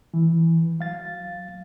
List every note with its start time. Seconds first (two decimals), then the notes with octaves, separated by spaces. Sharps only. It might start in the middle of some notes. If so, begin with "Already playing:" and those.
0.14 E3
0.79 F#3 F5 A6